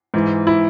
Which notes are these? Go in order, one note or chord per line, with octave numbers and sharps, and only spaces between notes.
G#2 E3
E4